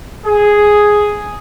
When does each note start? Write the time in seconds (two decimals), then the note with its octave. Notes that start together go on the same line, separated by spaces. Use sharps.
0.25 G#4